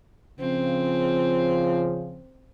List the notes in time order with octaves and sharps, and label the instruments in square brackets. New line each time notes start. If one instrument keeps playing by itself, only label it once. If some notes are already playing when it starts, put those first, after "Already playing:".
[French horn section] C#3 F3 [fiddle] C4